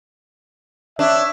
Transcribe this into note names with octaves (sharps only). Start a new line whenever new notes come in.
D4 C#5 E5